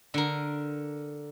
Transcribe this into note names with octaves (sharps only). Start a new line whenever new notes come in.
D3 A#4